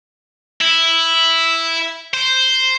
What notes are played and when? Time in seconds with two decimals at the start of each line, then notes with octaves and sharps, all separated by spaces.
0.61 E4
2.14 C5